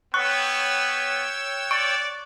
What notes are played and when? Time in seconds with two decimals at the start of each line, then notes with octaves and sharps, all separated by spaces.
0.14 B3 C#5 G5 C#6 E6 F#6
1.71 D5 C#6 D7